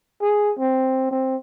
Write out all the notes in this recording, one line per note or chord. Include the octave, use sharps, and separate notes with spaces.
G#4
C4
C4